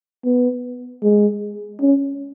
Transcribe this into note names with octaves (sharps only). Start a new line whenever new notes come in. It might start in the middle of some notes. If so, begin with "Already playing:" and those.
B3
G#3
C#4